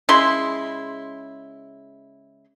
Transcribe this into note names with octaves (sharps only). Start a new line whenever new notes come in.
C#3 G#3 E4 C6